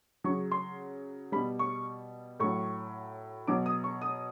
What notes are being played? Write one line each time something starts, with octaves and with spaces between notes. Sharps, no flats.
C#3 F#3 C#6
C6
B2 G3 B5
C#6
A2 F#3 C#6
B2 F#3 D6
D#6
C#6
D#6